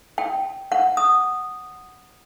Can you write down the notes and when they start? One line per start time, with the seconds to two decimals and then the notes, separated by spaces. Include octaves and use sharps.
0.18 G5
0.72 F#5
0.97 D#6